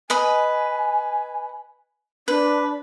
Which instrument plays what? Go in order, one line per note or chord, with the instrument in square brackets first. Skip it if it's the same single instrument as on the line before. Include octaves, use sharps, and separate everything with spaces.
[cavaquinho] B4 D#5 B5 [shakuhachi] G#5
[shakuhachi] D4 [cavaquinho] B4